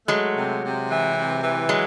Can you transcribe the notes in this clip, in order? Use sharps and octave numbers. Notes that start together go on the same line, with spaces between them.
F#3 G#3 A3
C3
C3
E3
C3
E3
F#3 G#3